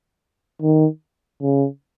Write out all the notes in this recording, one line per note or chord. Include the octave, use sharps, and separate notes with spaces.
D#3
C#3